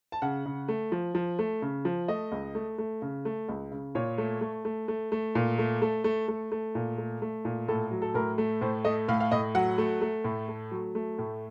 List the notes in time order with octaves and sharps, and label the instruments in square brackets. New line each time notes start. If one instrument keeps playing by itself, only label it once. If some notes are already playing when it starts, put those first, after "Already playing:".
[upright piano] A5
C#3 F#5
C#3
A3
F3
F3
A3
C#3
F3
A3 D#5
C#2
A3
A3
C#3
A3
C#2
C#3
A#2 C#5
A3
A3
A3
A3
A3
A#2
A3
A3 A4
A3
A3
A3
A#2
A3
A3
A#2
A2 A4
F#3
A4
A2 A#4
A3
A2 C5
A3 D#5
A2 F5
F5
A2 D#5
F#3 F#5
A3
A3
A2
A3
F#3
A3
A2